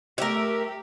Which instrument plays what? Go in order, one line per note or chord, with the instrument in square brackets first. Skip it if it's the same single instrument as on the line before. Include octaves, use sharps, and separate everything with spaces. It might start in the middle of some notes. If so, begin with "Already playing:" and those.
[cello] A3 G4 [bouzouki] A#4 E5